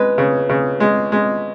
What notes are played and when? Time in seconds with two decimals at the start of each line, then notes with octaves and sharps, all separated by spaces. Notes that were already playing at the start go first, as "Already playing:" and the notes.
Already playing: G#3 B4
0.18 C#3
0.49 C#3
0.80 G#3
1.12 G#3